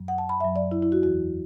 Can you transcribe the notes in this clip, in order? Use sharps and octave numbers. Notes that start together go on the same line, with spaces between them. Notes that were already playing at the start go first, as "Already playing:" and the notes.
Already playing: F#2 F#3
F#5
A5
B5
F#2 F#3 E5
D5
E4
E4
F#4
E2 E3 F#4